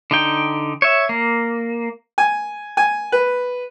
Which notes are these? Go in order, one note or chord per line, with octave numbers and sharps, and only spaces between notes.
D3 D#4 G5
C#5 E5
A#3
G#5
G#5
B4